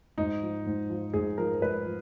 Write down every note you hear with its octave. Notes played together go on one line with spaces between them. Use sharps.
G#2 D#4
F3
G#2
F3
G#2 G#4
F3 A#4
G#2 B4
F3